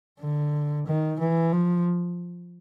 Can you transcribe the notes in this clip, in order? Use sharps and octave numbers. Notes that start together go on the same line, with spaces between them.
D3
D#3
E3
F3